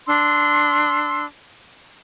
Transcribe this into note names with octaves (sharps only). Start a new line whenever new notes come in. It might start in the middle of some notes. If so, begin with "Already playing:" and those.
D4 C6 E6